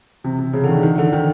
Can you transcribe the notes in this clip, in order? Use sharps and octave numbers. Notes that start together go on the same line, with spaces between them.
C3
C3
C#3
D3
D#3
D#3
D3
D#3